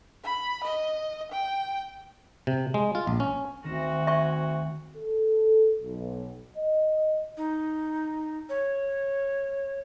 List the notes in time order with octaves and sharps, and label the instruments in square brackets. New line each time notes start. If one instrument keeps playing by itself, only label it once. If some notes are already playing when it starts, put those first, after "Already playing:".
[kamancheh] B5
D#5
G5
[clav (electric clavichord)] C3
G#3
F4
A#1
C#4
[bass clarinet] D2 [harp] D#3 A#6 E7 [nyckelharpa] C4 F#4
[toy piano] E5 C#6 [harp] G#5 F#6
[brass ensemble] A4
B1
D#5
[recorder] D#4
C#5